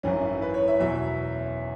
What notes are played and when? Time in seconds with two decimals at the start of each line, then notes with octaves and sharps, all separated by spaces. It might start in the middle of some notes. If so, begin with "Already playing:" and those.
0.03 G#1 F#2 E3 C#4
0.17 E4
0.29 E4
0.42 B4
0.54 C#5
0.68 E5
0.80 E2 B2 F#3 E5